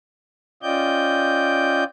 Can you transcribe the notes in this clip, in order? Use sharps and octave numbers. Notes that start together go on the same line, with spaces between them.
C#4 F4 D5 D#5 G5 G6